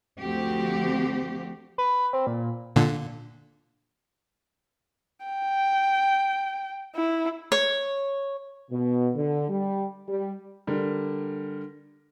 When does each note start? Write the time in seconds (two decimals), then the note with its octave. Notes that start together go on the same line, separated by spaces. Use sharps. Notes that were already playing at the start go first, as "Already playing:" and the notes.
0.19 D2 F3 C4 F#4 G4
1.78 B4
2.13 C4
2.27 A#2
2.76 A#2 D3
5.25 G5
6.95 E4
7.52 C#5
8.71 B2
9.15 D3
9.49 G3
10.07 G3
10.67 D3 G3 A#4